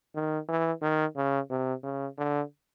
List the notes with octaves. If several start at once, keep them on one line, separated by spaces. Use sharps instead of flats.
D#3
E3
D#3
C#3
C3
C#3
D3